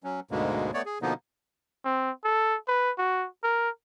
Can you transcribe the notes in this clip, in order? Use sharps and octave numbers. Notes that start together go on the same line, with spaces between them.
F#3 C#4
D2 G#2 B2 D3 G#3 A#3
A3 B3 C#5 D5
G#4
B2 D3 F3 A#3 B3 D#4
C4
A4
B4
F#4
A#4